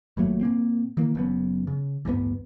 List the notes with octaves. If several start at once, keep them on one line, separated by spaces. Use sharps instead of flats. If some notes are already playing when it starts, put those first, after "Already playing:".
G#1 A#2 F#3 A3
A#2 A#3 C4
D#3 E3 A#3
F#1 F#2 B3
C#3
A1 D2 G2 B3